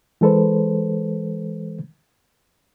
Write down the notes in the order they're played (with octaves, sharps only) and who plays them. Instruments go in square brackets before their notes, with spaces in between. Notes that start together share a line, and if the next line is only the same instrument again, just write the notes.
[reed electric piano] E3 G#3 A4 B4 C5